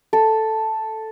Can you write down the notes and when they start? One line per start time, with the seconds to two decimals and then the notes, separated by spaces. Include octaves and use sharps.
0.13 A4